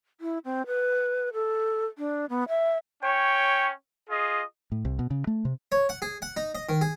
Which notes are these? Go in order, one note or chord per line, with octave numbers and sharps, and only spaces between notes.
E4
C4
B4
A4
D4
B3
E5
C#4 C#5 G5
F4 G#4 D#5
A2
C2
B2
C#3
A3
C3
C#5
F#5
G#4
F#5
D#4
D#5
D#3
G#4